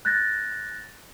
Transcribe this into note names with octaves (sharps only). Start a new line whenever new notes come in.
F#6 G6 A6 A#6